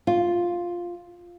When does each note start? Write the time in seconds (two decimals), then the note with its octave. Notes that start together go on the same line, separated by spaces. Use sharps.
0.07 F4